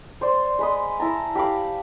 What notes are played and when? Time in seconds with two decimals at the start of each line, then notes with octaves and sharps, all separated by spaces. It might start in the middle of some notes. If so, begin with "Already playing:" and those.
0.21 C5 D5
0.59 G#3 B4 D#5
1.00 E4 A5 A#5
1.35 G4 F5 B5 D6